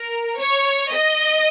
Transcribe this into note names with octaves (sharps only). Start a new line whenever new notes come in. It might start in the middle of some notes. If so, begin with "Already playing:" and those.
Already playing: A#4
C#5
D#5